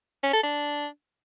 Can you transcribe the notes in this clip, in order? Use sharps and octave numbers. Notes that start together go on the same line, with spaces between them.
C#4
A4
D4